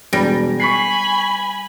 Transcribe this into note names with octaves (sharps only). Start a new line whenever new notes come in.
E1 G3 A#6 D7
G#5 B5 C#6 B6 C7